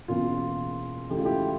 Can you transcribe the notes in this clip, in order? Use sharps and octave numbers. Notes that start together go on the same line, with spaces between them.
E1 E2 C#3 E3 A#3 F4
C#2 C#3 E3 A3 G4
F4
E4 G4